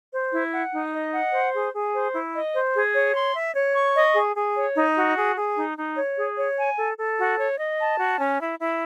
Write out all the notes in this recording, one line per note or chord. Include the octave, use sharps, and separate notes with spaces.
C5
E4
F#5
D#4
D#5
F#5
C5
G#4
G#4
C5
E4
D#5
C5
G#4
C#5
C6
E5
C#5
C#6
D#5
G#4
G#4
C#5
D#4
F#4
G#4
G#4
D#4
D#4
C#5
G#4
C#5
G#5
A4
A4
F#4
C#5
D#5
A5
F#4
C#4
E4
E4